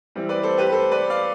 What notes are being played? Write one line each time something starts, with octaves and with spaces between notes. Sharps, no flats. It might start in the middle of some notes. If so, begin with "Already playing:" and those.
E3 G3 C4 E4
B4 D5
A4 C5
G4 B4
A4 C5
B4 D5
D5 F5